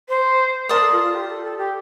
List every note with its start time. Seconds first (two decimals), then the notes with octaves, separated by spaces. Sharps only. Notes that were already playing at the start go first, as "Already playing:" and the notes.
0.09 C5
0.69 A#4 D5 A5 C6 D#6
0.81 A4
0.92 F4
1.03 F4
1.15 G4
1.29 A4
1.44 A4
1.58 G4